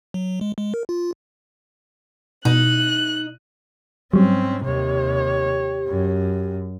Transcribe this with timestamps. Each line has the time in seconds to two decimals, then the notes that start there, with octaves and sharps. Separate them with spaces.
0.14 F#3
0.41 G#3
0.58 G#3
0.74 A#4
0.89 F4
2.45 B2 D#4 F#6
4.13 G#2 F#3 G3 C4 C#4
4.65 D#2 C3 G4 C#5
5.87 F#2